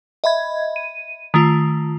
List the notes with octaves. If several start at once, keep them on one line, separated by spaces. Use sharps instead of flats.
D#5 E5 B5 G#6
D#7
D#3 A3 F4